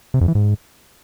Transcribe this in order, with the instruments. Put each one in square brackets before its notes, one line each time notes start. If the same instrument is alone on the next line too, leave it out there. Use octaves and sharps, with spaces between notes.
[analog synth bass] C3
F2
E3
G#2